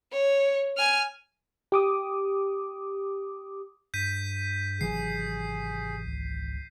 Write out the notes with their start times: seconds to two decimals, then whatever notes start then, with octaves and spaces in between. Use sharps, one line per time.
0.13 C#5
0.77 G#5 F6
1.72 G4 D6 D#6
3.94 G2 G6 B6 D#7
4.81 G#1 C3 E3 F#3 G#4 C7
6.06 C#2